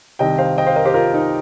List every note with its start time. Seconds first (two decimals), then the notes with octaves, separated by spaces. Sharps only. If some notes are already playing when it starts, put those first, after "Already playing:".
0.19 C2 C3 D#3 D#5 G5
0.38 C5 F5
0.58 D#5 G5
0.66 C5 F5
0.76 A#4 D#5
0.85 G4 C5
0.94 F4 A#4
1.14 D#4